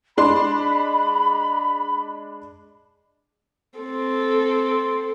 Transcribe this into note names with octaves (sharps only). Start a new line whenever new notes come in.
G#3 D4 B5 C6
C4 A4